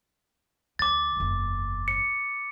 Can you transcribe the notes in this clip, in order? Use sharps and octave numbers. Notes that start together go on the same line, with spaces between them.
D2 D6 A6
F#1 E2
C#7